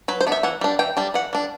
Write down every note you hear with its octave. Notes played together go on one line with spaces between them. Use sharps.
F#3 B4
C5
B3 D4
E5
E3 F#5
G3 D4
E3 G5
G3 D4
E3 F#5
G3 D4